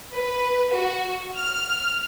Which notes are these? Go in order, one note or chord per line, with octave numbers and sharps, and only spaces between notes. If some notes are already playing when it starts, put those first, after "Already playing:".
B4
F#4
F6